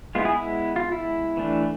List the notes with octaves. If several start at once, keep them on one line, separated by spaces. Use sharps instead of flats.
G#3 B3 E4 F4
E4 G#4
E4
F4
E4
E3 A3 D4